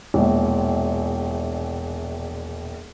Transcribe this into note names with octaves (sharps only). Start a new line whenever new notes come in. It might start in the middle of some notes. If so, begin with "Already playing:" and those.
E1 A#1